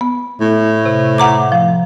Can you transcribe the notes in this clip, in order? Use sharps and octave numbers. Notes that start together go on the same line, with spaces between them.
B3
A2
C3
F#5 A#5 D6
F3